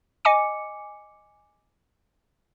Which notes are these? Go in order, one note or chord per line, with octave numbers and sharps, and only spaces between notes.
D#5 G#5 D6 C#7